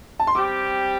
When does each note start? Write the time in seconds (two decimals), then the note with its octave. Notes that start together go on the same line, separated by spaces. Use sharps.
0.20 A5
0.27 C6
0.35 G3 C4 G4 D6